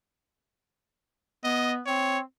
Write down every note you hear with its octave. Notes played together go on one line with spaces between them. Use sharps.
B3 D#5
C4 C#5